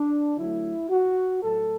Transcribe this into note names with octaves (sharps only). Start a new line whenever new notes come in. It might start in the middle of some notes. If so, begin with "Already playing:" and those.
Already playing: D4
D3 F#3 A3 E4
F#4
A2 F#3 A3 A4